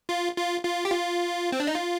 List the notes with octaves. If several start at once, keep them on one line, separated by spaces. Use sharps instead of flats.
F4
F4
F4
G4
F4
C4
D4
D#4
F4